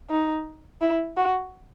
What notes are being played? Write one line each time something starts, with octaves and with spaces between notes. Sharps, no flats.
D#4
E4
F#4